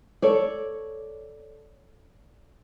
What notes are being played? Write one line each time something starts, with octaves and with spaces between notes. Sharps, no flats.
A4 C#5 D5